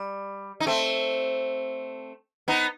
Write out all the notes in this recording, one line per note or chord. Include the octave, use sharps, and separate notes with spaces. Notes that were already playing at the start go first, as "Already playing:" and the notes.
Already playing: G3
D#4
A3 C4
B3 D#4